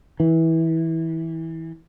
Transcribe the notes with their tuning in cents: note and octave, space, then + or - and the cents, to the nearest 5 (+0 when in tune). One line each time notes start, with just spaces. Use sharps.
E3 -20